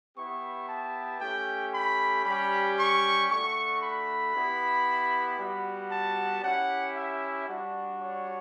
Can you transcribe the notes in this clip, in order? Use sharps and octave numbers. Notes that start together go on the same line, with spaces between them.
B3 E4 G4 C#6
A5
A3 C#4 G4 G5
B5
G3 C#4 G4 B5
C#6
A3 D4 F#4 C#6
B5
B3 E4 G4
G3 B3 F#4
A5
C#4 E4 G4 F#5
E5
G3 D4 F#4
C#5